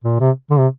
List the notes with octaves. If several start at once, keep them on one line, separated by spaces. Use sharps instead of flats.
A#2
C3
D3
C3